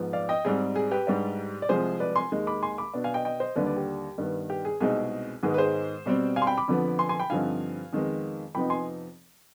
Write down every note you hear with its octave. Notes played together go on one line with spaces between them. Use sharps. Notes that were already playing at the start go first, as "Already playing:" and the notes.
Already playing: G#2 F3 B3
D5 F5
D#5 G5
G#2 G3 C4 G#4
G#4
G4 B4
G#2 G3 D4
D5
C2 C3 F3 G#3 G#4 C5
B4 D5
G#5 C6
D#2 D#3 G#3
B5 D6
G#5 C6
B5 D6
B2 B3 D4
F5 G#5
D#5 G5
D#5 G5
C5 D#5
D#2 D3 G3 D4 B4 D5
B4 D5
G4
G2 D#3 B3
G4
G#4
C2 B2 G#3 C4 D#4 G#4
G#2 D#3 G#3 B3 G#4
B4
G#4 C5
B2 G3 C4
F5 G#5
C6
G5 B5
B5 D6
F2 D3 F3 B3
G#5 C6
G#5 C6
G5 B5
G2 D3 F3 C4 D#4 F5 G#5
F2 D#3 G#3 B3
F2 C3 F3 B3 D#4 G5 B5
G#5 C6